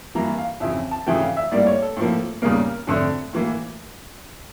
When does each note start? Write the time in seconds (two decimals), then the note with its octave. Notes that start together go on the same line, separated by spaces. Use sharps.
0.15 G2 E3 A#3 A#5
0.38 F5
0.60 F2 C#3 E3 E5
0.91 A5
1.06 C#3 E3 A3 G5
1.21 F5
1.37 E5
1.52 A2 G3 A#3 D5
1.67 C#5
1.82 A4
1.97 A2 F3 A#3
2.42 E2 C#3 G3 A#3 A#4
2.87 F2 D3 A3
3.33 A2 E3 A#3